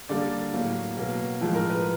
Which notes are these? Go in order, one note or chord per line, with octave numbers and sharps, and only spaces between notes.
D3 G3 A#3 D5
A2 F#3 A#3
B2 F#3 A#3
A2 F3 G#3
A#4
B4